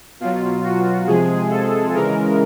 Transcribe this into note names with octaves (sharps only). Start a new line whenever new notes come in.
B2 F#3 F4
F#4
C3 F3 G#3 G#4
A4
C#3 E3 G#3 A#4